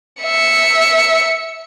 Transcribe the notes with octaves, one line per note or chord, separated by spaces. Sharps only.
E5 C#7